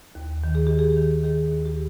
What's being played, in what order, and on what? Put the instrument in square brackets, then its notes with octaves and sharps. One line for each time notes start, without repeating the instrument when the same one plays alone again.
[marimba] D#2
D#3
G#4
D#3 G4
G#4
D#3
D#3 G#4
D#2
G4